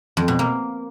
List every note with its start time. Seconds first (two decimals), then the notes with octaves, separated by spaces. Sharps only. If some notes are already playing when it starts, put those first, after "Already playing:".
0.17 F2
0.28 B2
0.39 A#3